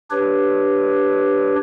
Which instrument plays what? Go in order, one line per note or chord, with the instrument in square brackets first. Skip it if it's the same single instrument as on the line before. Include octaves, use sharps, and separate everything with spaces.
[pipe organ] D4 G4 B4 C#5